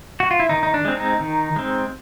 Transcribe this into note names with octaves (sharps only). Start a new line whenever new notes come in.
F#4
F4
E4
D#3 D#4
D#4
D4
G#3 C4
D#4
D#3
G#3 C4